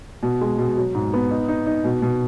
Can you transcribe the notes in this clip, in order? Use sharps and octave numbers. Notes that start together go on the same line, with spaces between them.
B2
G#3
B2
F#3
G#2
B3
D#4
D#4
D#4
B2
B2